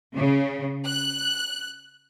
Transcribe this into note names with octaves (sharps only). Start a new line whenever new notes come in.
C#3
F#6